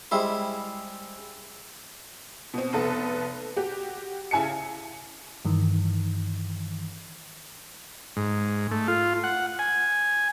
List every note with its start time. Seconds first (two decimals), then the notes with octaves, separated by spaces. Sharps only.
0.11 G3 G#3 E4 C5
2.54 B2 C4
2.73 F1 B3 A4 B4
3.56 F#4 G4
4.31 C#3 E4 G#5 A5 C#7
5.45 G2 D#3 E3
8.17 G#2
8.71 A3
8.88 F4
9.24 F#5
9.59 G#5